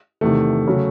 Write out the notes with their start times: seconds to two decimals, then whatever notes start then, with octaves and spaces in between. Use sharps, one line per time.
0.21 E2 C3 D#3 A3
0.67 C#3 F#3